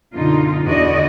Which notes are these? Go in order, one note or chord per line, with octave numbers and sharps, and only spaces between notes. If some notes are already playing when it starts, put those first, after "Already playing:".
F#2 B2 D3 D#4 F4
E2 D3 E3 F#4 D5 D#5